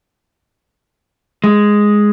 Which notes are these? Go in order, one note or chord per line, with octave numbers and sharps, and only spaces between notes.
G#3